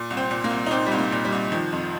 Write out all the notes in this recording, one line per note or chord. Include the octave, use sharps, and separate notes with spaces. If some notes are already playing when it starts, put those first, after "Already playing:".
Already playing: A#2
C2
C4
A#2
A#3
C2
D#4
A#2 C4
C2 G3
A#3
A#2
G3
C2
D#3 F3
F2